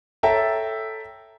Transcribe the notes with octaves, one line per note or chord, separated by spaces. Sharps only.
A4 C#5 E5 G5 A5 A#5